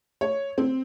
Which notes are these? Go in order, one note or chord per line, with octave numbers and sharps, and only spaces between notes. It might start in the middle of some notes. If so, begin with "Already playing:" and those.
C#5
C4